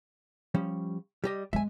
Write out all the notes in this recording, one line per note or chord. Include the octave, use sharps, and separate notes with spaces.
F3 G3 C#4
G3 G4 D#5
G#3 E5 G#5